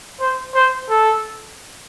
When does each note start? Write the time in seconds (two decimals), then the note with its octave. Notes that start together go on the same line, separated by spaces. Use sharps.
0.20 C5
0.55 C5
0.90 A4